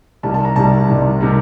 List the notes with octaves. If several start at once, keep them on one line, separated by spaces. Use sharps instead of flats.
C2 C3 D#3 G3 A5
A5
A#5
C2 C3 D#3 G3 A5
C2 C3 D#3 G3
C3 D#3 G3